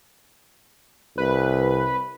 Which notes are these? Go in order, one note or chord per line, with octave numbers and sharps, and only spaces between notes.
C2 B4